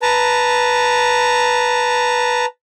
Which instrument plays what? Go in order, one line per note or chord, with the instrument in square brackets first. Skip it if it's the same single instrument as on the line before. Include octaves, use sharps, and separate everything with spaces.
[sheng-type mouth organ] B4 A5 A#5